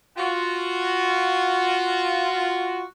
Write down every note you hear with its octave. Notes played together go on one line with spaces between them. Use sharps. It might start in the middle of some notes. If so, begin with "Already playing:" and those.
F4 F#4